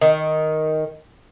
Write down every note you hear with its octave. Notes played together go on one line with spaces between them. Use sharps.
D#3